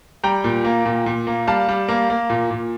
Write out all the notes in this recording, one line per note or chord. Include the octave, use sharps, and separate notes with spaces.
G3 G5 A#5
A#2
A#3
A#2
A#2
A#3
G3 F5 A5
G3
A#3
A#3
A#2
A#2